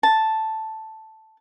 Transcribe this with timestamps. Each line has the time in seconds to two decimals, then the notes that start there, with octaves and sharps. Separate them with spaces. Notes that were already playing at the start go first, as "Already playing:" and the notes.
0.03 A5